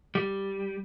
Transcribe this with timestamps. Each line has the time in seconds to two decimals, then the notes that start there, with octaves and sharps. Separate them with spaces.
0.15 G3